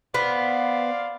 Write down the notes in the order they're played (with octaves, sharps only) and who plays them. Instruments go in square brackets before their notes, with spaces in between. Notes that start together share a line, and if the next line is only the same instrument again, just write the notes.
[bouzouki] B3 [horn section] C5 D5 F5